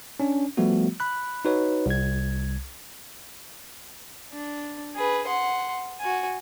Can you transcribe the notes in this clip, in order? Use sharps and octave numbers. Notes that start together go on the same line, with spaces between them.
C#4 D4
F3 G3 A3 B3 F#4
B5 F#6
D#4 F#4 B4 C#5
C2 G#6
D4
G#4 B4
F#5 C6
F#4 G#5